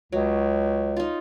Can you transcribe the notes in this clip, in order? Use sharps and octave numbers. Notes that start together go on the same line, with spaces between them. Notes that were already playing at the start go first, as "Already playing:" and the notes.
C#2 F#3
D#4 F4